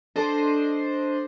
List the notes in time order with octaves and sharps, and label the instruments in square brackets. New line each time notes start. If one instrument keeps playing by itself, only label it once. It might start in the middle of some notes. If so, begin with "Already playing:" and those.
[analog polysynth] D4 C5 D#5 [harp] A4 A5